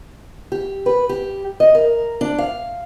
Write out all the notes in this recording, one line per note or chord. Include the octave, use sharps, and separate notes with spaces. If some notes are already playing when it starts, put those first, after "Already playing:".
G4
B4
G4
D#5
A#4
D4
F5